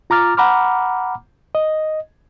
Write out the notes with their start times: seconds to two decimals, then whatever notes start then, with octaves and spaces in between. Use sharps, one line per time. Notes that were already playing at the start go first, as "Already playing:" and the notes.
0.10 F4 A#5 D6 F6 A6
0.37 F#5 A#5 B5 D6 F6
1.55 D#5